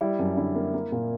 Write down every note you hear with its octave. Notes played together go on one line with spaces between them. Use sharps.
G3 E4
F#2
D3 E4
A#3
A#3
A#2